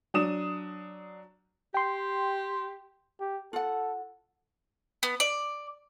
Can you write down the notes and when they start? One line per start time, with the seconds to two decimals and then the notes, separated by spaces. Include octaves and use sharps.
0.14 F#3 D4 D#6 E7
1.74 G4 G5 C6
3.20 G4
3.53 F4 A4 F#5
5.03 B3
5.20 D5